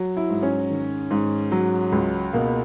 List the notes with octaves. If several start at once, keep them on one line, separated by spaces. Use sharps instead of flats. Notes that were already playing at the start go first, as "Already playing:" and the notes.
Already playing: F#3
E4
G#2
C#4
D#3
G#2
F#3
C#2
B2 A#3